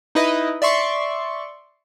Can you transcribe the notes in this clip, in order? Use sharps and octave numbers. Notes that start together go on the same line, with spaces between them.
D#4 E4 B4 D#5
D5 E5 C6 C#6